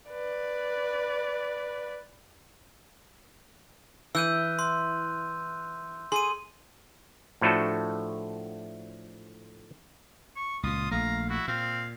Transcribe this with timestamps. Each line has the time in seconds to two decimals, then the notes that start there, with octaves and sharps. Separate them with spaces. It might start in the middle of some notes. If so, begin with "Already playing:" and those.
0.10 B4 D5
4.15 E3 E6 G6 D#7
4.59 C6
6.12 G#4 C6 D#7
7.41 A2 F3 A3 D4 F#4 A4
10.36 C#6
10.63 C#2 A#2 F4 D#6
10.91 A#1 A3 F5 A#5
11.30 E4 F#4
11.48 A#2 C4 F5